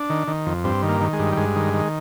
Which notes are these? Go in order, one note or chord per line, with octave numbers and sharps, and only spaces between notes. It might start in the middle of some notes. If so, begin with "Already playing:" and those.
Already playing: D4
D#3
D#3
F2
G2 C4
D#3
A#3
D#3
G#3
G2
G3
G2 G#3
D#3
D#3